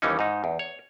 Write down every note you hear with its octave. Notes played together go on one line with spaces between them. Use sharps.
D#2 E3 G3 C#4 D#4
G#2 D#4
E2
C#5